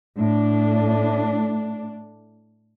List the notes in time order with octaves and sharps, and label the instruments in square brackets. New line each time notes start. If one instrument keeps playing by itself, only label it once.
[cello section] A2 D4